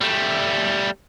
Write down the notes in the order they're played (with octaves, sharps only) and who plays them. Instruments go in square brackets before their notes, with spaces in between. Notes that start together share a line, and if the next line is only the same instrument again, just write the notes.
[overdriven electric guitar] G3 A3